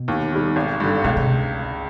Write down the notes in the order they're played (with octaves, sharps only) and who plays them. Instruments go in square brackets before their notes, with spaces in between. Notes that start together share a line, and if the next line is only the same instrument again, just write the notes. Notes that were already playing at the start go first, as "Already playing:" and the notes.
Already playing: [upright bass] B2
[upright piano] D#2
D#3 G3
G#1
G2 D3
[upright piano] C#2 [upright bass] B2
[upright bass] C3